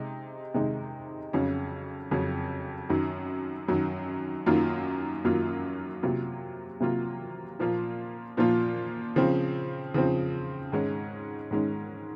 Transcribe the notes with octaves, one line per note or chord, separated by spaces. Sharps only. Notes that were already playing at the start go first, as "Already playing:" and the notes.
Already playing: C3 G#3 D#4
C3 D#3 G#3 D#4
F2 C#3 F#3 C#4
F2 C#3 F#3 C#4
F#2 D#3 F#3
F#2 D#3 F#3
F#2 D#3 F#3 A#3 F4
F#2 D#3 F#3 A#3 F4
C3 F#3 A#3 F4
C3 F#3 A#3 F4
A#2 F3 A#3 F4
A#2 F3 A#3 F4
C#3 F3 C4
C#3 F3 C4
G#2 D#3 G#3 C#4
G#2 D#3 G#3 C#4